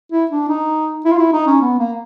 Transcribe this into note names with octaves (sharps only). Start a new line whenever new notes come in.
E4
D4
D#4
E4
F4
E4
D#4
C#4
B3
A#3